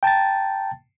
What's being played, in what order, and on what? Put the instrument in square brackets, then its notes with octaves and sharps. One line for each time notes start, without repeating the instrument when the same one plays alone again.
[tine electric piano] G5 A5 A#5 A6